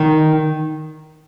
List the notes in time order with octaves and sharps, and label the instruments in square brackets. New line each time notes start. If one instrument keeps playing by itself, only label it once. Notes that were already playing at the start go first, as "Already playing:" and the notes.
Already playing: [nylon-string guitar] D#3